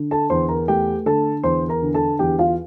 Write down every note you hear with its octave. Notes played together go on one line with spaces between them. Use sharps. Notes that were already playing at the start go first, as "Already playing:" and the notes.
Already playing: D3
A4 A5
E2 C5 C6
A#4 A#5
A3 G4 G5
D3 A4 A5
E2 C5 C6
A#4 A#5
D3
A4 A5
E2 G4 G5
F4 F5